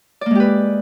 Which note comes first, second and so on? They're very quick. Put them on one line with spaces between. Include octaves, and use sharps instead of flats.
D5 A#3 G#3 G4 B4